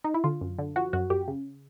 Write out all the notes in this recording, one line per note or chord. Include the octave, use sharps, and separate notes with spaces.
D#4
E4
D3 F4
F#2
D3
F3 F#4
F#2 F#4
F#2 G4
C#3